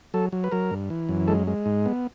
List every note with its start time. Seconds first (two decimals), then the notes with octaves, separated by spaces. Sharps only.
0.14 F#3 A4
0.32 F#3
0.44 B4
0.52 F#3 A#4
0.71 G2
0.90 E3
1.09 F#2
1.28 G#3 A4
1.47 G#3
1.66 G#2
1.86 B3